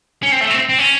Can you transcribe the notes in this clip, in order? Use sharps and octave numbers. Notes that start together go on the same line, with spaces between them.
C#4
C4
A3
C4
C4
C#4